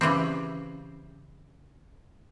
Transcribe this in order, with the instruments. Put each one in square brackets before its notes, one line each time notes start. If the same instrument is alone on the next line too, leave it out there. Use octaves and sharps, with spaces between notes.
[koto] C#3 E3 G3 C4